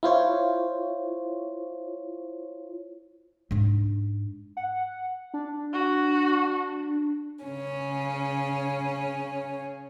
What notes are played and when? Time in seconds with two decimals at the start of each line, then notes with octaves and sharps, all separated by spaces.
0.03 E4 F4 C5 C#5
3.51 G#2 D4
4.57 F#5
5.34 D4
5.73 F#4
7.44 C#3 C#4